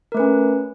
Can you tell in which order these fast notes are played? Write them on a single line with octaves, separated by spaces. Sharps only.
A#4 A3 B4 C#4